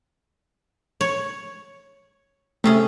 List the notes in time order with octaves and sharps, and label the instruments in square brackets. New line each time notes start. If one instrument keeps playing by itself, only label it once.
[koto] C#5
[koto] C3 C#4 G#4 [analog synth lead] A3